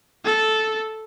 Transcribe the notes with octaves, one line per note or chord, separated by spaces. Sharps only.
A4